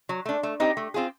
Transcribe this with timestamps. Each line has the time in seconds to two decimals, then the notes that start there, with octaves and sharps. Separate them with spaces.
0.09 F#3
0.26 A3 D4
0.43 A3
0.60 C4 D#4 G4
0.77 A3
0.94 C4 F4 G#4